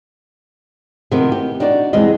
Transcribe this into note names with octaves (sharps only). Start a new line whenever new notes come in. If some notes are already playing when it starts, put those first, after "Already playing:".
C3 D#3 F3 A3 B3
G4
D4 D#4 F#4 C5 D5
E2 C3 G3 G#3 D#5